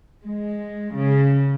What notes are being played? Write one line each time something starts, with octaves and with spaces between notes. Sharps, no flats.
G#3
C#3